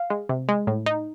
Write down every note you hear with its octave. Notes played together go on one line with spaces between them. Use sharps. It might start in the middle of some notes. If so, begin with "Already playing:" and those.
Already playing: F5
G#3
C3
G#3
A2
D#4